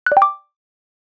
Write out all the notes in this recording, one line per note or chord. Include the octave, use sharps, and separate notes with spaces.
F#6
D5
G5
D6